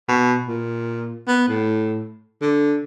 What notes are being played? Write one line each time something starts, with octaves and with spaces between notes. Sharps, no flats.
B2
A#2
B3
A2
D3